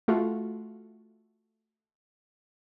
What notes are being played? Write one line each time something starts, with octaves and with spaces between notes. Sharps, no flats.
A3 F4 F#4